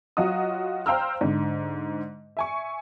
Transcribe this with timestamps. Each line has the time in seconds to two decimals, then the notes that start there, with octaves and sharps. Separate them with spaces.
0.17 F#3 F4 F#4 D#5 D#6
0.86 C5 F5 G5 A#5 E6 F6
1.21 G#2 D3
2.37 E5 G#5 C#6